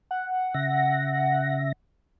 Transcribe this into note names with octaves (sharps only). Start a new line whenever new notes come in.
F#5
C#3 E5 A#6